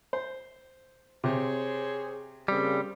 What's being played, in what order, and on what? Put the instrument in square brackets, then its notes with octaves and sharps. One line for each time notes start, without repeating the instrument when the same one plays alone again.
[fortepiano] C5
[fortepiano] C3 [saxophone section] G#4 C5 C#5
[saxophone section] C#3 A#3 C4 [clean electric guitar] G3